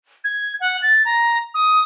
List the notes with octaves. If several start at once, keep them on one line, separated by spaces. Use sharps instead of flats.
G#6
F#5
A6
A#5
D#6